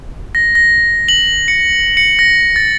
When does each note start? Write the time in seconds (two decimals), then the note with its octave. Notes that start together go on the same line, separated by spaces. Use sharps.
0.35 A#6
0.55 A#6
1.08 F#7
1.48 C#7
1.97 C#7
2.19 A#6
2.56 A6